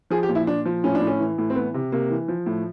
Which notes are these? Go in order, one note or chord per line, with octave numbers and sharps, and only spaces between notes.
F3 G#4
G4
A#2
E4
A#2 D4
F3
A2 C#4
D4
A2
C#4
E3
A2
C4
E3 B3
C3
C3 A#3
E3
F3
A2